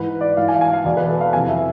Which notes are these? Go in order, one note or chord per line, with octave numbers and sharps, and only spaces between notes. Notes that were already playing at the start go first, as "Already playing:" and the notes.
Already playing: G#2 E3 B4
D5
G#2 E3 F5
G#5
F5
G#5
F5
E2 B2 D5
B4
A4
F5
F2 C3 E3 G#5
E5